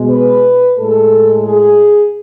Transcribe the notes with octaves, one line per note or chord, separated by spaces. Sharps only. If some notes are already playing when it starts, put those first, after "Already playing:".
Already playing: B2 G#3
B4
A2 G#3 A4
G#4